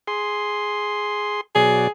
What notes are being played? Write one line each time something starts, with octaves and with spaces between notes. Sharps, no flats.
G#4 C6
B2 F#3 G#4 D5